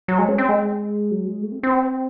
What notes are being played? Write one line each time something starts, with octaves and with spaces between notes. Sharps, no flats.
F#3
G#3
C#4
C4
G#3
F#3
G#3
A3
C4
C4